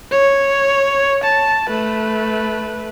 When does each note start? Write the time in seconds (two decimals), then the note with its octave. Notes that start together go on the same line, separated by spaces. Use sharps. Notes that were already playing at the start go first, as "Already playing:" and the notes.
0.12 C#5
1.24 A5
1.69 A3 B4